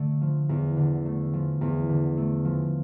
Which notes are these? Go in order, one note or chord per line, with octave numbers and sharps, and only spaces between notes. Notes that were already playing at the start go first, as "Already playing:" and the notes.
Already playing: D3 A3
F3
E2
D3
A3
F3
E2
D3
A3
F3